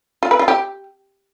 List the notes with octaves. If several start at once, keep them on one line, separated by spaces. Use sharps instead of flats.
F4
B4
F4
G4